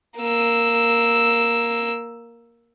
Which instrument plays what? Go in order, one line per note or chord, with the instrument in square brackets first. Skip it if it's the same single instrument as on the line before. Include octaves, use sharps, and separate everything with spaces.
[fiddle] A#3 E6